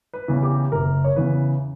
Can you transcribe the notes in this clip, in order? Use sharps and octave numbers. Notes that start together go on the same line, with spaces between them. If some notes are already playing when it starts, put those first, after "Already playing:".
B4
E2 C#3 E3
G4
F#1 A#4
C#5
E2 C#3 E3 B4